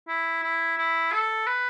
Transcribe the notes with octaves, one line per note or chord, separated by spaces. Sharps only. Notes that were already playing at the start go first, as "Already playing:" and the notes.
E4
E4
E4
A4
B4